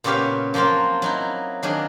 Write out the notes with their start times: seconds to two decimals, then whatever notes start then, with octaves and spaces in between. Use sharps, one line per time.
0.04 A#2 C#3 B3 G4 C#5 F5
0.54 F3 F#3 A#3 C4 F4
1.02 F#3 D#4 E4
1.63 D#3 F#3 D4 G#4